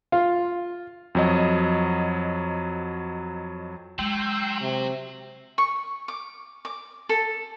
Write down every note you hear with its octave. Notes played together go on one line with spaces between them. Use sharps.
F4
F2 F#3 D#5
F#3 G#3 G5 C6 E6
C3
C#6
D6
D6
A4